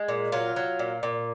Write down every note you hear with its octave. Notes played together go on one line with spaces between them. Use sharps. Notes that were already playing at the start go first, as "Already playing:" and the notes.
Already playing: G#3
A#2
F#3 F4
F#3
A#2
A#2